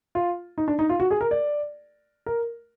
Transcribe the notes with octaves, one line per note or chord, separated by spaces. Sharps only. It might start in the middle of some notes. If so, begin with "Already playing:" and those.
F4
D#4
D4
D#4
F4
F#4
G#4
A#4
D5
A#4